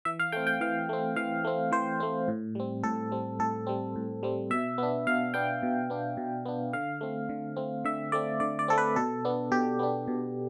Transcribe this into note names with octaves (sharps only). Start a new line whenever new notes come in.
E3 E5
F5
A3 C4 G5
G5
E3 F5
A3 C4
E3 F5
A3 C4
E3 C5
A3 C4
A2
G3 C4
A2 A4
G3 C4
A2 A4
G3 C4
A2
G3 C4
B2 E5
B3 D4
B2 F5
B3 D4 G5
B2
B3 D4
B2
B3 D4
D3 F5
A3 C4
D3
A3 C4
D3 E5
A3 C4 D5
D3 D5
D5
A3 C4 A4
B4
B2 A4
B3 D4
B2 G4
B3 D4
B2